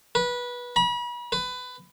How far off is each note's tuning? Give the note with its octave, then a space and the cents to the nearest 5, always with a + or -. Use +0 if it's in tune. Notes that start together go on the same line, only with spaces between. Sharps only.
B4 -20
B5 -40
B4 +20